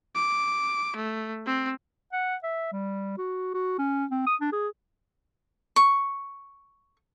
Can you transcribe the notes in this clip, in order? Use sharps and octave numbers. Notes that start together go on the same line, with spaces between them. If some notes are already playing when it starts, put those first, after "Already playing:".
D6
A3
C4
F#5
E5
G3
F#4
F#4
C#4
C4
D#6
D4
G#4
C#6